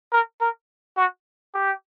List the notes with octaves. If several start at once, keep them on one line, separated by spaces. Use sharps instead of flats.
A#4
A#4
F#4
G4